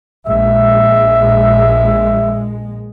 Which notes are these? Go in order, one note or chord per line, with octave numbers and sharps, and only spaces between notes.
A#1 G#3 E5